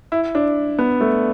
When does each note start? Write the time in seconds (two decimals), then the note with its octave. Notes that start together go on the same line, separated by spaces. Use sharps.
0.12 E4
0.35 D4
0.79 B3
1.01 A3